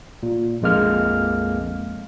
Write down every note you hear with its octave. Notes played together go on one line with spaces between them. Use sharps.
A#2
A#1 F2 G#3 A#3 F6